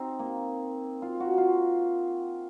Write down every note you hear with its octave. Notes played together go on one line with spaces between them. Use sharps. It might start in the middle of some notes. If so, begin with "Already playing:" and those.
Already playing: C4 D#4
A#3
F4
F#4
F4